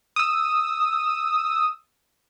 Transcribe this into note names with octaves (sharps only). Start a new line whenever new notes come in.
D#6 E6